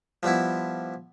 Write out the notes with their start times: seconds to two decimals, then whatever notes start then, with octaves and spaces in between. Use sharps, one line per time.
0.23 F3 G3 B3 E4